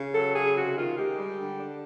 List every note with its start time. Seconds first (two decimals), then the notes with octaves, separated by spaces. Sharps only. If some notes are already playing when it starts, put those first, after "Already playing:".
Already playing: C#3
0.13 F#3 A4
0.35 C#3 G#4
0.55 C3 F#4
0.76 D#3 F4
0.97 G#3 G4
1.17 G3
1.37 D3
1.58 D4